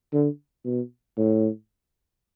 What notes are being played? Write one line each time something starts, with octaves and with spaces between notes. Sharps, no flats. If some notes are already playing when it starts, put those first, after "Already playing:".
D3
B2
A2